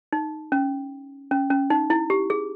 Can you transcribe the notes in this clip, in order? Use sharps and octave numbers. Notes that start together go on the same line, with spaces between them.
D#4
C#4
C#4
C#4
D#4
E4
G4
G#4